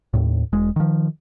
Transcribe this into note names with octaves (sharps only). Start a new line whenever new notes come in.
D#2 A2
E1 G#3
D#3 F3